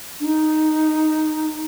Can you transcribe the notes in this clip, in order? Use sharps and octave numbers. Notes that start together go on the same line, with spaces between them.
D4
D#4